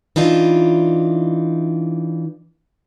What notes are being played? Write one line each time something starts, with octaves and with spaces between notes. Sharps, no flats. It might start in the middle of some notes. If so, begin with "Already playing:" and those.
E3 D4 D#4 F4